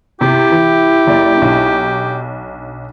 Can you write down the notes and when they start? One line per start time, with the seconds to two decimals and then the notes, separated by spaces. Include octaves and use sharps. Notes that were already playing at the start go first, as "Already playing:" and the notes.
0.21 C3 E4 G4
0.51 E3
1.07 F#1 D5
1.38 B1 D4